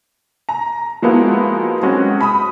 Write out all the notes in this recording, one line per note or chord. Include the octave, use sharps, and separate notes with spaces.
A#5
F3 G#3 A#3 B3 E4 F#4
F#3 G#3 C4 C#4 F#4
B5 D#6